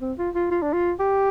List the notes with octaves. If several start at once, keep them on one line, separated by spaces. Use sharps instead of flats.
C4
F4
F4
F4
D4
F4
G4